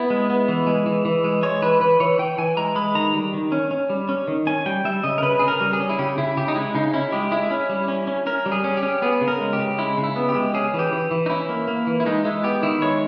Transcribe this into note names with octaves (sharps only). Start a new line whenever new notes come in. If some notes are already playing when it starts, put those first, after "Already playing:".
Already playing: B3 E4
G#3
B3
E3
G#3
E3
E3
G#3
G#3 C#5
E3 B4
E3 B4
E3 C#5
E3 G5
E3 G#5
G#3 A#5
G#3 B5
D#3 A#5
G3
D#3
C#4
C#4
G3
C#4
D#3
C#4 G#5
G3 G5
G3 E5
C#3 D#5
A#4
C#3 B4
C#3 G#4
A#4
G3
G#4
C#4
E4
C#3 G4
C#3 E4
C#3 G4
D#4
G#3 E4
C#3 D#4
C#4 E4
G#3 G4
G#3 E4
C#4
G3
C#4
C#4
C#4 A#4
G3
G#4
C#4
G4
C#4
B3 G#4
C#3
A#4
G#3
G4
C#3
G#3 E4
C#3
E4
B3
G4
G#3
C#4 G#4
E3
G4
E3
E3
D#4
C#4 E4
A#3
A#3
E3
E4
G#3 D#4
G#3 E4
B3 G4
D#3 E4
G#3 C#5